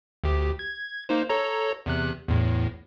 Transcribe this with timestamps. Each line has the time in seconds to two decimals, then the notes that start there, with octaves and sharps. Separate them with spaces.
0.24 D2 G4
0.59 G#6
1.09 A#3 D#4 C5
1.29 A4 C#5 A#5
1.86 E2 C3 F#6
2.28 E2 A2